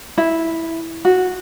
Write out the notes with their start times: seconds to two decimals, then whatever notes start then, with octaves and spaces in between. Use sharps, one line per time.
0.18 E4
1.05 F#4